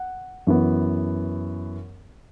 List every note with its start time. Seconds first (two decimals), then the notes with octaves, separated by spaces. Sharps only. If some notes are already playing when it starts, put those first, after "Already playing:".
Already playing: F#5
0.47 F#2 E3 B3